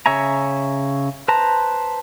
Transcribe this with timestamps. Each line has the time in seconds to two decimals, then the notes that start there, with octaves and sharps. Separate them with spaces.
0.06 C#3 C#5 E5 G#5 A#5
1.28 B4 C5 A5 A#5